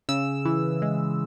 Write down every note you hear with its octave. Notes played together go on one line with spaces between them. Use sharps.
C#3 E6
E3
G#3